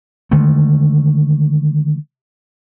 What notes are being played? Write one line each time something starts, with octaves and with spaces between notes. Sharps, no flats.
D3 D#3 G#3 A3